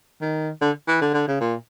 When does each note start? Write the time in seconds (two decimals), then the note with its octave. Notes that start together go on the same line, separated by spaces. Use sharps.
0.22 D#3
0.62 D3
0.88 E3
1.01 D3
1.14 D3
1.28 C#3
1.41 A#2